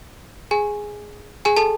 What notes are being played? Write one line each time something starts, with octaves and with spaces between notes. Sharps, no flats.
G#4 G#5
G#4 G#5
A4 A5